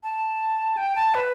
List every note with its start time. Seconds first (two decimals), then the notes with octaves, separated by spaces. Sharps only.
0.03 A5
0.77 G5
0.96 A5
1.14 B4